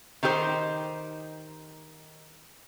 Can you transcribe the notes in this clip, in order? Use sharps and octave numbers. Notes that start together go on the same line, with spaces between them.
D#3 D#4 G4 A4 C5